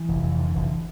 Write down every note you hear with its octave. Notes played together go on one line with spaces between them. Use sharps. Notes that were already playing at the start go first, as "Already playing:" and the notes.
Already playing: E3
F1
F2
D3
F1